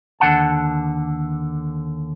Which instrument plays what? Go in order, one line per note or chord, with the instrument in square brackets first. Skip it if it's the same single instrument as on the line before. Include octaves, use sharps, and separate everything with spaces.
[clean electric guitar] D#2 D3 F#5 A5